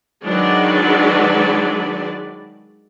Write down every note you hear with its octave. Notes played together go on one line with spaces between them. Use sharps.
D#3 F#3 G#3 D4 B4 D5